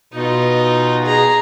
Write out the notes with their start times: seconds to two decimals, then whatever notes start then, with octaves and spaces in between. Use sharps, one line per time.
0.14 B2 D#4 F4
1.05 G#4 A#5